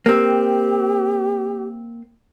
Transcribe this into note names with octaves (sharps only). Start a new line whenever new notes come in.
A#3 C4 G4